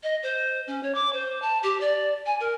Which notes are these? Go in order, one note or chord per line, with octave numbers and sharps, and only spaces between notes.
D#5
C5
C#4
C#5
D6
C5
A5
G4
D5
G#5
A#4